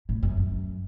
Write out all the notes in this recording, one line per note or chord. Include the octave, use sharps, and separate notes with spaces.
A2
F#2
F#2